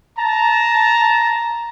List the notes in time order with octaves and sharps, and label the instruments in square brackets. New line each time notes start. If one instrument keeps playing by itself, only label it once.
[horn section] A5 A#5